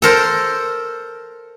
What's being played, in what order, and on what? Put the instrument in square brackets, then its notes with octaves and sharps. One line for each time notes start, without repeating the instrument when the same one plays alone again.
[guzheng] A4 A#4 C5